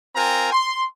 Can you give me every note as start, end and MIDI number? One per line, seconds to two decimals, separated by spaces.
0.16 0.52 60
0.16 0.52 65
0.16 0.52 70
0.16 0.52 79
0.16 0.52 80
0.16 0.52 82
0.53 0.86 84